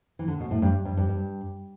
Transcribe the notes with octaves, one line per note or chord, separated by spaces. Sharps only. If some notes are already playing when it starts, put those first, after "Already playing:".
E3
D3
B2
A2
G2
G2
G2
G2